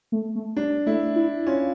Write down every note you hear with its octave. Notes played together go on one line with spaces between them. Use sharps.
A3
A3
G3 D4
A3 E4
E4
C#4 F4